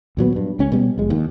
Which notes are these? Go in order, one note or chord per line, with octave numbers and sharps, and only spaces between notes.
D#2 A#2 F#3 B3
G2
C#2 C#4
B2 G3
F1 G#3
D#2